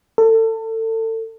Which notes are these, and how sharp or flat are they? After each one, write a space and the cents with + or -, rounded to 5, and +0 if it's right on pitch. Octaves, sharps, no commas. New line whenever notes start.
A4 +30